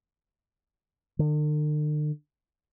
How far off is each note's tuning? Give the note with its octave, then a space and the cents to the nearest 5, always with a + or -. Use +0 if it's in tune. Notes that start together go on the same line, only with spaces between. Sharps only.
D3 +45